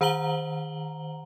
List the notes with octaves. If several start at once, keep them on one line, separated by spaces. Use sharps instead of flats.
D#3 C5 F#5 A#5 F#7 G7